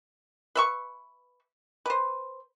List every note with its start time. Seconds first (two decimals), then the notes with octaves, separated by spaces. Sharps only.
0.55 B4 E5 C#6
1.86 B4 C5